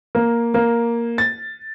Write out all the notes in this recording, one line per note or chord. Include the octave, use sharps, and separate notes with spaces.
A#3
A#3
A6